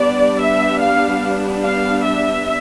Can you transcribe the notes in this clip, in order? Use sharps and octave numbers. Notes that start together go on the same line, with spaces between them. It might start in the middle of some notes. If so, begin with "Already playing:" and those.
Already playing: G3 B3 D4 D5
E5
F5
F5
E5